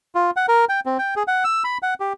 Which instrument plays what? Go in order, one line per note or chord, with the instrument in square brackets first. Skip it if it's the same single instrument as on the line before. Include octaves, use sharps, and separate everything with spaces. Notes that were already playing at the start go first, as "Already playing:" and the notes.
[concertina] F4
F#5
A#4
G5
C4
G5
G#4
F#5
E6
B5
F#5
G4